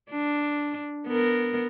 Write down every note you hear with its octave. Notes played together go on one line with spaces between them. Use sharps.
D4
B3 A#4